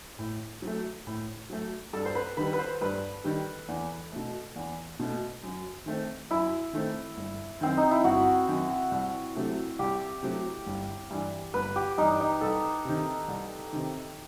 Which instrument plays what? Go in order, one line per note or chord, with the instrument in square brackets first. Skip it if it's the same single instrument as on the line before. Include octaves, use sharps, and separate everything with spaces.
[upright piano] A2
F#3 A3
A2
F#3 A3
[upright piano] G2 [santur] A4
[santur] C5
B4
[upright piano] D#3 G3 [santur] B4
[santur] B4
C5
[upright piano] G2 [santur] B4
[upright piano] D#3 G3
E2
B2 A3
E2
B2 A3
F#2
D#3 A3 C4
[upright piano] F#2 [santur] E4
[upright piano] D#3 A3 C4
G1
[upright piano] F#2 D#3 [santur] C4
[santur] D#4
E4
[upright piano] G1 [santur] F#4
[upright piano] F#2 D#3
C2
C3 F#3 A3
[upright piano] C2 [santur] G4
[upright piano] C3 F#3 A3
G1
G2 E3
[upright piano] G1 [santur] B4
[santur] G4
[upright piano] G2 E3 [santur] D#4
[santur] D#4
[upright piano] C2 [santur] A4
[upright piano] C3 D#3
C2
C3 D#3